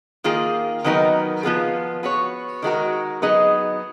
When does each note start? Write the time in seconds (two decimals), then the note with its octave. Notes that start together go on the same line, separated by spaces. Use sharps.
0.24 D#3 A#3 F4 G#4
0.84 D#3 F#3 B3 D#4 A#4
1.43 F3 B3 F4 G#4
2.03 B3 F#4 C#5
2.62 D#3 G#3 C#4 F#4 A#4
3.22 F#3 B3 D#4 G#4 D#5